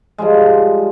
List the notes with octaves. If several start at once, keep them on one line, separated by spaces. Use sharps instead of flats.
F3 G3 G#3